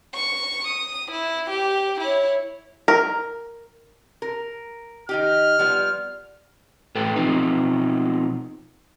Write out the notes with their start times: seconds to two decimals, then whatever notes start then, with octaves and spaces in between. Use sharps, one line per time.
0.14 C#6 C#7
0.67 D#6
1.11 E4
1.50 G4
2.00 E4 C#5
2.88 A#4
4.22 A#4
5.09 D#3 D#4 G4 F6
5.59 F3 G3 B3
6.95 A2 A4 B4 G5
7.16 B2 F3 C4 D#4